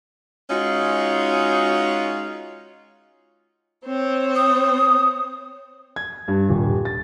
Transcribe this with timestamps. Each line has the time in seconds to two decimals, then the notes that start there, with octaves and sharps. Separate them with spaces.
0.50 G#3 C#4 D#4 F4 F#4
3.86 C4 C5 C#5
4.36 D#6
5.96 G#6
6.28 G2
6.49 D#1
6.85 A6